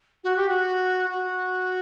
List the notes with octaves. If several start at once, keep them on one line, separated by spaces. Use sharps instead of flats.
F#4
G4
F#4
F#4